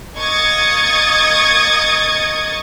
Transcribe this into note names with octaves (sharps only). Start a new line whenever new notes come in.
A#3 D#5 C#6 D#6 G#6 A6